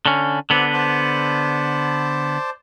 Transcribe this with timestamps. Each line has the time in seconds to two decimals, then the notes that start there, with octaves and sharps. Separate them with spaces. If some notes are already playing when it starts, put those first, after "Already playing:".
0.06 D3 C#4
0.50 D3 B3 C4 G4
0.73 C5 D5 A5